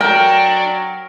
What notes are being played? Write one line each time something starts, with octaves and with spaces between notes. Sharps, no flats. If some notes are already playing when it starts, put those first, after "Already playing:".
F#3 D4 A#4 G5